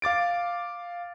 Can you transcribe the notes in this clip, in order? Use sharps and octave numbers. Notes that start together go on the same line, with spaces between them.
F5 D6 A6 D7